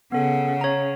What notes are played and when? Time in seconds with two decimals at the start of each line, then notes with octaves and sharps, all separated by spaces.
0.12 C#3 B3 A4 F#5
0.61 C#5 A#5